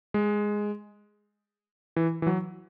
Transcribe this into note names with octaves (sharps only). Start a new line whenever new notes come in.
G#3
E3
E3
F#3